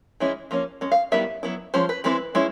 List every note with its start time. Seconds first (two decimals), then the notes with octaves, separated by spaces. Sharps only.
0.20 E3 G#3 C#4 E4
0.51 F3 A#3 C#4
0.81 G#3 C#4
0.92 F5
1.12 D#3 G3 B3 E4 E5
1.43 F#3 B3 E4
1.74 F3 G#3 C#4 C5
1.89 B4
2.04 E3 G#3 C4 E4 B4
2.35 G#3 C#4 E4